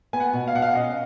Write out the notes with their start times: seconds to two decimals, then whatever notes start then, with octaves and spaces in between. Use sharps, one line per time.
0.13 B3 G#5
0.20 F#5
0.33 B2
0.48 F5
0.55 B2 F#5
0.62 F5
0.75 C#4 D#5